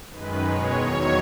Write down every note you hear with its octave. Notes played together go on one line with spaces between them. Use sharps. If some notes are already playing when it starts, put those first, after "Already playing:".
F#2 D#3 G#3 B4
B2 G#3 C#5
E2 D#3 F#3